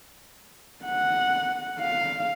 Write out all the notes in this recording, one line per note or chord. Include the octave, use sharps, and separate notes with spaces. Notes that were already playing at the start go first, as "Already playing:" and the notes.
F#5
F5